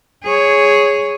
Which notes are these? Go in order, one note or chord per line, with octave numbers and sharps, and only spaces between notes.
G#4 C#5